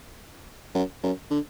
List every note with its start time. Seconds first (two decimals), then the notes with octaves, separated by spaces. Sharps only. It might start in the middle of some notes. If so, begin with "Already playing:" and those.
0.75 F#2
1.03 F#2
1.30 D3